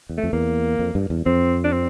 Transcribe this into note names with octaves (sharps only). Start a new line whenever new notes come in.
E2
A3
F2
E2 A#3
F2
G2
E2
F2 C4
D4
C4